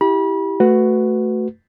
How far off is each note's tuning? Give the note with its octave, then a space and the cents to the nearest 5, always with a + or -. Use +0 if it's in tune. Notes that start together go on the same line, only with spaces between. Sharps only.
E4 +0 G4 +0 B5 -30
A3 +0 F#4 +0 B4 +15